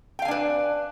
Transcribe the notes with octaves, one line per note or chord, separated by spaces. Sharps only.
D4 B4 F5 G5 G#5